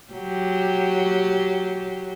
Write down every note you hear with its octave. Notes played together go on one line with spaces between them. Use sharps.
F#3 G4